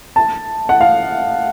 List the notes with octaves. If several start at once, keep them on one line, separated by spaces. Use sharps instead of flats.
A5
F#5
F5